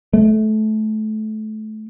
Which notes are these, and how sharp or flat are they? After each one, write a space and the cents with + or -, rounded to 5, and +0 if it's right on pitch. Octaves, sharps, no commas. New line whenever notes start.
A3 -25